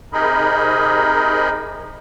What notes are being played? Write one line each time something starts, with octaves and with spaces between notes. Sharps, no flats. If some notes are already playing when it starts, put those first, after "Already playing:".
C3 D#4 G#4 A#4 D#5 B5